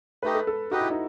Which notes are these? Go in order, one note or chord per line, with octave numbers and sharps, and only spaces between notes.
A3 D#4 G4 B4 D#5
A4
A4
D#4 F#4 G4 B4 D#5
E4
D#4